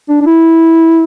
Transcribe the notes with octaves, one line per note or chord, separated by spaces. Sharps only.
D4
D4
E4